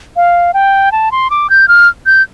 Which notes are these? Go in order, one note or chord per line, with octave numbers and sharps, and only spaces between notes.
F5
G5
A5
C6
D6
G6
F6
G6